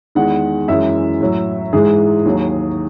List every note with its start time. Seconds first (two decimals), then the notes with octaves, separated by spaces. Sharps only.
0.15 E2 D#3 G#3 F#5
0.68 F#2 E3 G#3 E5
1.21 A2 F#3
1.73 G#2 E3 G#3 G#4
2.25 D#2 D#3 F#3